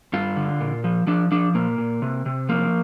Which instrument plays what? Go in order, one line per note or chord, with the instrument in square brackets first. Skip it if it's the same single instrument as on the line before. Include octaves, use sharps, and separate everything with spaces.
[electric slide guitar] G2 F4
D3
A#2
F3
F3 D4
F3 D4
A#2 A#3
A#2
C3
C3
F3 A#3